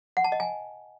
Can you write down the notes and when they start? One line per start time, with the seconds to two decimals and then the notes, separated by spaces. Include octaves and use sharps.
0.17 F#5
0.24 A5
0.32 D#5
0.40 G#5